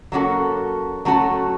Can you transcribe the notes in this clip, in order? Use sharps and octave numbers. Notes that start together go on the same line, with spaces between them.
F#3 A#3 C#4 F#4 A4
F#3 A3 C#4 F#4 A4